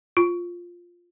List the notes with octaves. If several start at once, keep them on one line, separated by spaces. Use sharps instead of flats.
F4